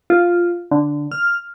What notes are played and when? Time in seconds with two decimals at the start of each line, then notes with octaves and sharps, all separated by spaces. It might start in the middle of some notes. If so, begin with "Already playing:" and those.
0.10 F4
0.71 D3
1.12 F6